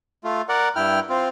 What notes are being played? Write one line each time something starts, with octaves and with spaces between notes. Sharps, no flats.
A3 F4
A#4 D5 F#5
G2 E4 G5 F6
C4 F4